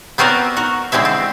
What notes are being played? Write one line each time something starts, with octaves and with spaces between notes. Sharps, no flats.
B3 C4 F#4 A#4 D5
F#4 A#4
D3 G#3 C4 E4 E5
C4